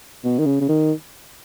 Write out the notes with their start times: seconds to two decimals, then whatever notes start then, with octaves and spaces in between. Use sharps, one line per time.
0.24 B2
0.39 D#3
0.46 C#3
0.61 C#3
0.69 D#3